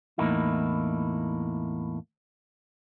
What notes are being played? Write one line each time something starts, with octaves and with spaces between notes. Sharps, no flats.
E2 A2 A#3 D#4 E4